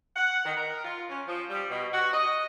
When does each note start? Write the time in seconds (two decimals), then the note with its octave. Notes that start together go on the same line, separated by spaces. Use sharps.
0.15 F#5
0.44 D#3
0.57 A#4
0.83 F4
1.09 C#4
1.27 F3
1.50 G3
1.69 B2
1.92 F#4
2.12 D#5